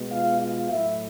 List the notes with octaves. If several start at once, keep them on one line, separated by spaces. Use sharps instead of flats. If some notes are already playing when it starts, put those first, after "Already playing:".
Already playing: B2 G#3 B3
F4 F5
F4 F5
A2 F#3 A3 E4 E5